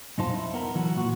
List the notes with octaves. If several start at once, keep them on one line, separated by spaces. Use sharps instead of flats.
B1 F2 D#4 F4 C5 A5
E4
B3 A#4
E3 F#3 F#4
A#2 F#4